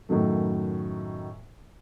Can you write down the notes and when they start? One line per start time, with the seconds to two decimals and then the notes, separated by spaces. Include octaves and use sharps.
0.09 F#2 A2 D#3 F#3 A3